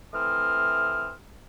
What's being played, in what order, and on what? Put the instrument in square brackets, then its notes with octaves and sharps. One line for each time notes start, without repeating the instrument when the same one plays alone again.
[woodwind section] E3 A3 C4 D#6 F6